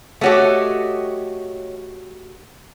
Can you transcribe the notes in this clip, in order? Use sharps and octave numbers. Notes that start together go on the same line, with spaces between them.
A3 F#4 G4 A4 C#5 D#5